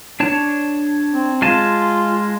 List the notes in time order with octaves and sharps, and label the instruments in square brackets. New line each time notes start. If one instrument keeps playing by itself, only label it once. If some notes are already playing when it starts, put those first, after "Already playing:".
[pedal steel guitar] D4 C#5 A5
[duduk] C4
[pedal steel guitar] G#3 G#5 A5 [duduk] F4